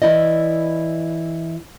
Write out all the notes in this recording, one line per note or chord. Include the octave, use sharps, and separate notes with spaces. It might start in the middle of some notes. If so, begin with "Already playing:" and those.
E3 E4 D5 D#5